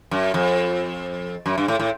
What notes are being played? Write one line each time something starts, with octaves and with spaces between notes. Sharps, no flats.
F#2
F2
F#2
G2
A2
A2